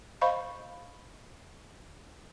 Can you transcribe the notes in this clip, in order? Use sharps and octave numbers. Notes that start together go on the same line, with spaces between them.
C5 D#5 F5 B5 C#6